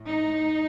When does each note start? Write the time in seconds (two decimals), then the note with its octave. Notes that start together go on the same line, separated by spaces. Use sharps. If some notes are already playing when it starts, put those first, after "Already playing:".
Already playing: A2
0.08 D#4